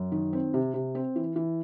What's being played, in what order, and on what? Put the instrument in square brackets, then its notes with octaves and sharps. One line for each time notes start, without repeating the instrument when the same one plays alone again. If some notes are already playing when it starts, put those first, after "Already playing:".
Already playing: [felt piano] F#2
D#3
C4
C3
C3
C4
E3
E3